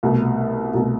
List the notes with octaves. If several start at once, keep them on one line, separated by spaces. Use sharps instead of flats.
C2 B2 A3
C2 B2 A3